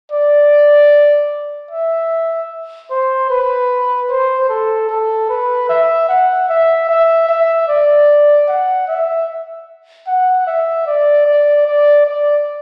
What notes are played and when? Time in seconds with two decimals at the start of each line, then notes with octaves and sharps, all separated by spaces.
0.12 D5
1.71 E5
2.91 C5
3.30 B4
4.10 C5
4.50 A4
4.90 A4
5.29 B4
5.69 E5
6.09 F#5
6.49 E5
6.89 E5
7.29 E5
7.68 D5
8.48 F#5
8.88 E5
10.07 F#5
10.47 E5
10.87 D5
11.26 D5
11.66 D5
12.06 D5